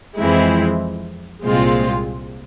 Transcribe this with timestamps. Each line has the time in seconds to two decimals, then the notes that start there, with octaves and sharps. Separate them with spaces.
0.17 F2 E3 G#3 C4 E4
1.44 C2 A#2 G#3 C4 F4